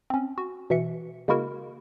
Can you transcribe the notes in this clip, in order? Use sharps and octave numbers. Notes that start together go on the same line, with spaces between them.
C4 C#4
F#4
B2 E3 E5 C#7
C#3 G#3 A#3 E4 F#4 A#4